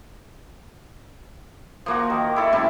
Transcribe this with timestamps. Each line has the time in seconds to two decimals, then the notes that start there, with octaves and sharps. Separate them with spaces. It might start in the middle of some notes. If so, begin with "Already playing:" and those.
1.86 F3 A#3 F#4
2.10 D#3
2.36 E4 A4
2.52 A2 C3 G3 C#4